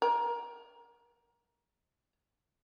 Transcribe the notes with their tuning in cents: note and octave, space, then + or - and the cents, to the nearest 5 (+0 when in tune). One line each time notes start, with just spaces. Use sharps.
A#4 +15